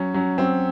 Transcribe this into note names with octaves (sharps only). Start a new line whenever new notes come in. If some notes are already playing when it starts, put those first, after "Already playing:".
Already playing: F#3 C#4
F#3 C#4
F#3 C4